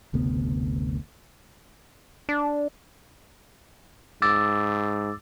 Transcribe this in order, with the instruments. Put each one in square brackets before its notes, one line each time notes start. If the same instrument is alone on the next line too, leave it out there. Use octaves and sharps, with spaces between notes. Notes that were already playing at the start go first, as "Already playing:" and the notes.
[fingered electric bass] F#1 D2 C3 B3
[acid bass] D4
[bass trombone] G#2 [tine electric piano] D6 E6 A6